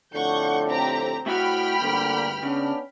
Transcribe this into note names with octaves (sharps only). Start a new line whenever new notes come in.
F2 A2 D3 F#5 C#6 G6
C4 G4 A#5
A2 E4 F#4 G5 B5 F6
D2 G2 D3 A#3
C#3 B3 C#4 D4